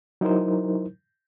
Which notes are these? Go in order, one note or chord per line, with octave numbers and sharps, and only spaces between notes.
F#3 D#4 E4 A#4 C5